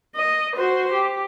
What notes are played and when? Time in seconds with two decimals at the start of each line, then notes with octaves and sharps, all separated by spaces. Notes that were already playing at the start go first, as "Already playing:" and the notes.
0.15 D#5
0.56 F#4 C5
0.93 G4